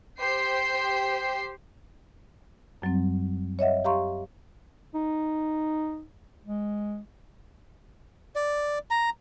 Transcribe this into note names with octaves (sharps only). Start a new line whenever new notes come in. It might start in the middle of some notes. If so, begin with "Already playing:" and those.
G4 C5 G5 C7
F#2 F#3 G3 C4
C#5 D#5 E5 F#5
G4 F5 A#5 C6 C#6
D#4
G#3
D5
A#5